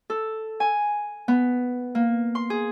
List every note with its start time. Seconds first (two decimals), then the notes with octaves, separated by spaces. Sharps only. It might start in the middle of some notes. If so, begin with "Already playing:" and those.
0.10 A4
0.60 G#5
1.28 B3
1.95 A#3
2.35 C6
2.50 G#4